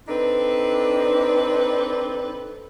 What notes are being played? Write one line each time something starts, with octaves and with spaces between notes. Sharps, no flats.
C4 D4 D#4 A4 B4